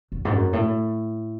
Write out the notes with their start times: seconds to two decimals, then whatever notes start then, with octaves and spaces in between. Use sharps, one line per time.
0.12 E2
0.25 G#2
0.32 F#2
0.53 A2